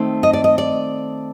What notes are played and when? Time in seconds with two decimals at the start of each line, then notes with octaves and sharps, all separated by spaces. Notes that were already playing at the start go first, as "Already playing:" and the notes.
Already playing: D#3 A3 C4
0.23 D#5
0.33 D5
0.44 D#5
0.58 D5